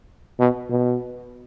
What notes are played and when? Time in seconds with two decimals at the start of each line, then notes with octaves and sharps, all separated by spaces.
0.39 B2
0.69 B2